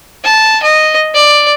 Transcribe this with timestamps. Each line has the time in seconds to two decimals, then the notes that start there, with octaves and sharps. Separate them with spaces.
0.24 A5
0.63 D#5
1.15 D5